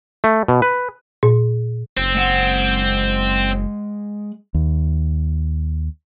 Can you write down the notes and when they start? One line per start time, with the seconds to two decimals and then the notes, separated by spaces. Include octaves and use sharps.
0.24 A3
0.48 B2
0.62 B4
1.23 A#2
1.97 F#1 C4
2.14 G#3 F#5
4.54 D#2